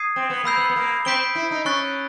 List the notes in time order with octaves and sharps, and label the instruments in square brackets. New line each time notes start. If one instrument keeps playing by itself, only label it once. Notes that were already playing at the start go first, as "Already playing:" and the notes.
Already playing: [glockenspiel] D#6 G#6 C7 D#7
[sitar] C4
B3
[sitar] A#3 [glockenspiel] B5 E6 G6 C7
[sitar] B3
B3
A#3
[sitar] C4 [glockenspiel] G6 B6 D7 G7
[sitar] E4
D#4
[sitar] C#4 [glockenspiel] C#6 F#6 A6